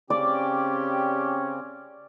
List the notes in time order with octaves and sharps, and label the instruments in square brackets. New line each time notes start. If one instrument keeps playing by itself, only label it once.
[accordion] C#3 C4 [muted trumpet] C#4 [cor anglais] G4 [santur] D5